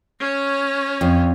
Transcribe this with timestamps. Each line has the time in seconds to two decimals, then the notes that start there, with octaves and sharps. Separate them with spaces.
0.20 C#4 C#5
1.01 F2